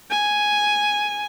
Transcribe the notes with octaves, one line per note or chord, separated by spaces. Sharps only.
G#5